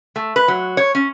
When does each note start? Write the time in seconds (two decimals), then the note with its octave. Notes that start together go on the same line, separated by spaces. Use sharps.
0.16 A3
0.36 B4
0.48 F#3
0.77 C#5
0.95 C#4